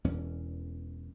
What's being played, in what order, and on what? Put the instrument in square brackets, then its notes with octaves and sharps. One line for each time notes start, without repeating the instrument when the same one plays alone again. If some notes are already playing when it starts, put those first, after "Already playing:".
[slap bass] E1 E2 E3 C#4